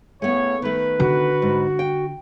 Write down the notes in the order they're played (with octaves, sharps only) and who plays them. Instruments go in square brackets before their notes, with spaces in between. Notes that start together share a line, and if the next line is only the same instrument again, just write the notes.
[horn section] A2 C#3 C#5 [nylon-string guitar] A3 B3
[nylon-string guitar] D#3 A3 [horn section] B4
[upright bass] D3 [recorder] F#4
[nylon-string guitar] G#2
G5